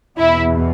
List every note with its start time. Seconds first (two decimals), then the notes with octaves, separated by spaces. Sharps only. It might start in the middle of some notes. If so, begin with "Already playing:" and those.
0.17 E2 B2 E4